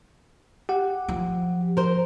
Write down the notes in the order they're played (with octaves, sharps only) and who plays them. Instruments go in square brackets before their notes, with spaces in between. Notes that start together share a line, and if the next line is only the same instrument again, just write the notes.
[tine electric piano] G4 F#5
[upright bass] F3
[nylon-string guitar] A#4 C5